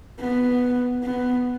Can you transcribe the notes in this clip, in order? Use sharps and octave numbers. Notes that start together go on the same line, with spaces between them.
B3
B3